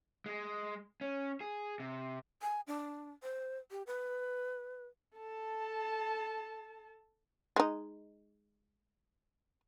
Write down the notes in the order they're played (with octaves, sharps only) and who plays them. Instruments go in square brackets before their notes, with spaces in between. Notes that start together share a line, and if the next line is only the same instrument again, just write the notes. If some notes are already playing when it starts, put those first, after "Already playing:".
[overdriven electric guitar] G#3
C#4
G#4
C3
[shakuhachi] G#5
D4
C5
G4
B4
[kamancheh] A4 A5
[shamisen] G#3 D#4